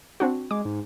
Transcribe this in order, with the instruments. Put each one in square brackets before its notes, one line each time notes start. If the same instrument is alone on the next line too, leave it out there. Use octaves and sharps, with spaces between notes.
[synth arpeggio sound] C4 D4 F#4
[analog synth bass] G#3 [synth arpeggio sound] D6
[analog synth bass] G#2